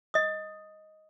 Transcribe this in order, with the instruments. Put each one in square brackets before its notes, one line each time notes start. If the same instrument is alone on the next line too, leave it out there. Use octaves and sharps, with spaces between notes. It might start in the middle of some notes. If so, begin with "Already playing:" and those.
[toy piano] D#5 D#6